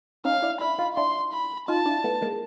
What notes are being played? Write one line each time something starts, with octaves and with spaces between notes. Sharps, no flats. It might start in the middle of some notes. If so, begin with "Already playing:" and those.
C#4 D#4 F5
D4 E4
D4 E4 B5
D#4 F4
D4 E4 C6
B5
D#4 F4 A5
D4 E4
A3 B3
G#3 A#3